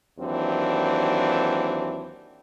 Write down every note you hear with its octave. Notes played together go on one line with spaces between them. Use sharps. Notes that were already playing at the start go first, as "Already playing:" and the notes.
D#2 E3 F#3 C4 D4